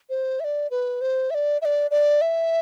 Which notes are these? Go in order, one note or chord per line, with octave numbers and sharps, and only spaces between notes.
C5
E5
D5
B4
C5
E5
D5
E5
D5
D5
E5